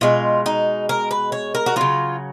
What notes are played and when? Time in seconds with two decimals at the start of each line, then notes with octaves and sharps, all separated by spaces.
0.01 B2 G#3 F4
0.46 D#4
0.89 A#4
1.11 B4
1.32 C#5
1.55 A#4
1.66 F#4
1.76 C#3 F#3 F4